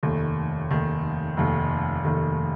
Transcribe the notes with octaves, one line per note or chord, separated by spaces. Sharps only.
F1 D#2 D#3 A3
F1 D#2 D#3 A3
F1 D#2 D#3 A3
F1 D#2 D#3 A3